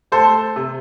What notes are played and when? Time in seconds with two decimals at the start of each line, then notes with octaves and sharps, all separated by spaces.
0.12 A3 A4 C5
0.56 C3